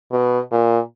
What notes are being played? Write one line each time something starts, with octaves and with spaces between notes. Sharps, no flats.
B2
A#2